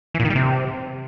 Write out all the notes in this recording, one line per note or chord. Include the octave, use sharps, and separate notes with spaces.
E3
A#2
D#3
G3
C3